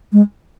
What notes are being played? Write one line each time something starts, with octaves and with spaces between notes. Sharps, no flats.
G#3